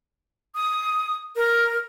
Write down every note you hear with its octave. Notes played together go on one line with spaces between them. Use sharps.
D#6
A#4